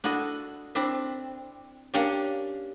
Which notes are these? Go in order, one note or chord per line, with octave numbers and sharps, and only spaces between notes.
D4 E4 F#4 A4 D#5
C4 D4 E4 D5 E5
A#3 C#4 D4 G4 D5